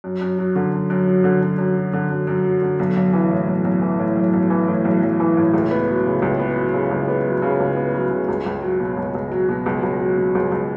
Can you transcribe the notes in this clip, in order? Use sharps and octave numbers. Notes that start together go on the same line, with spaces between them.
F#2
F#2
F#3
D3
F#2
F#2
F#3
D3
F#2
F#2
F#3
D3
F#2
F#2
F#3
D3
B1
B1
E3
A2
B1
B1
E3
A2
B1
B1
E3
A2
B1
B1
E3
A2
C#2
B3
F#3
C#3
C#2
B3
F#3
C#3
C#2
B3
F#3
C#3
C#2
B3
F#3
C#3
C#2
C#2
F#3
B2
C#2
C#2
F#3
B2
C#2
C#2
F#3
B2
C#2
C#2